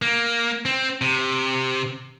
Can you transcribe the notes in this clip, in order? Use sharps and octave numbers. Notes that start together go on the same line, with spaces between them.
A#3
C4
C3